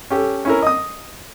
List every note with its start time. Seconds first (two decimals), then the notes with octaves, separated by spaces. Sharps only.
0.10 C#4 G4 A4
0.45 C#4 E4 A#4
0.62 D#5 D#6